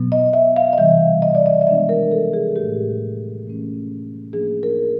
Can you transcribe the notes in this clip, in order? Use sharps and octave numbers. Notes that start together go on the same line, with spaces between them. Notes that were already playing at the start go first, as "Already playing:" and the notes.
Already playing: B2 F#3 B3
D#5
E5
F5
D#5
C3 E3 G3 E5
D#5
D5
D#5
E5
F3 G#3 B3 D4 D#5
A#4
A4
G#4
A2 E3 A3 G4
E3 A3 C#4
F3 A#3 D4 G#4
A#4